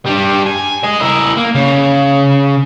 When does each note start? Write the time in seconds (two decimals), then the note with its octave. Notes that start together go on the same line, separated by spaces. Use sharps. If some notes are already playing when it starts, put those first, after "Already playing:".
0.06 G3 D4
0.46 G#5
0.84 D#5 G#5
1.01 E4 A#4
1.38 A#3
1.55 C#3